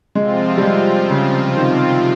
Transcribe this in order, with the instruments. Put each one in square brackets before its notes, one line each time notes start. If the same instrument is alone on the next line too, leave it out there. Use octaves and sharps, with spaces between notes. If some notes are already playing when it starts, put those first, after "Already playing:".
[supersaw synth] C3 F3 C4 F4 [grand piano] G#3
[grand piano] G3
G#3
C#3
D#3